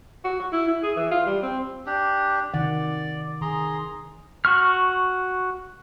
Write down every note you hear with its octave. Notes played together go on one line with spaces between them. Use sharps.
F#4
F#4
E4
E4
G#4
E3
F4
G3
C4
D4 G4
C3 D#3 D5 F#5
D#3 G#4 A#5 C6
F#4 C#6 F6